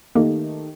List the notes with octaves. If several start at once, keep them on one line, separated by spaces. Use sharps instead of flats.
D#3 A3 A#3 D#4 G4